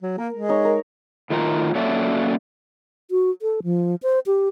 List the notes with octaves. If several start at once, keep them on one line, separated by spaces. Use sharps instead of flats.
F#3
A#3 A#4
G#3
D#4 C#5
A#4
A2 D#3 A3 F4 A#4 A#5
F#3 A#3 C#4 A4 D5 E5
F#4
A4
F3
C5
G4